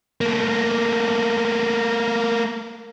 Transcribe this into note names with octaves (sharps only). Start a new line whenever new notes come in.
A3 A#3